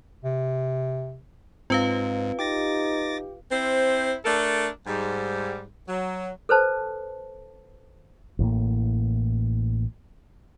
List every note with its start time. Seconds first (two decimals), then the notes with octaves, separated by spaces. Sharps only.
0.24 C3
1.70 G#2 C4 F4 B4 F5
2.39 D#4 G4 D6 A6 A#6
3.51 C4 E4 C5
4.24 A3 D4 A4 A#4
4.87 G#2 G3
5.89 F#3
6.49 A4 B4 C5 A5
8.39 A1 A2 A#3